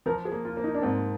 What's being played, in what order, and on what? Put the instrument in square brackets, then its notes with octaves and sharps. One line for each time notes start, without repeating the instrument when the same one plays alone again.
[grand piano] F3 [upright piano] A#4
[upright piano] G#4
[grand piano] A#3
[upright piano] F4
[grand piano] A#3
[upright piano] D#4
D4
[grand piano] G#2 [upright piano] C4